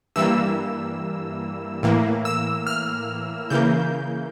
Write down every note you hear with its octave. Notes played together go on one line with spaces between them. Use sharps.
G2 E3 G3 A#3 E6
A2 E3 A#3
E6
F6
C#3 E3 A#3 G6